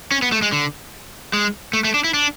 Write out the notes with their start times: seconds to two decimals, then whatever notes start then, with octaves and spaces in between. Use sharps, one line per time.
0.12 C#4
0.22 B3
0.32 A3
0.42 G#3
0.52 D3
1.33 G#3
1.73 A3
1.84 A3
1.94 D4
2.04 E4
2.14 D4